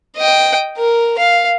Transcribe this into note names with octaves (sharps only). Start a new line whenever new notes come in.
D#5 G5
A#4
F5